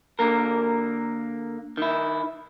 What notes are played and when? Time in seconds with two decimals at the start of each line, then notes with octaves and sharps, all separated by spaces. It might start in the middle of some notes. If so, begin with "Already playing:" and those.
0.19 D3 A#3 A#4
1.77 D#3 E4